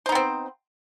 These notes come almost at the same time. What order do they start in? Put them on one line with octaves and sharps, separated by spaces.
C5 D#4 B3 C4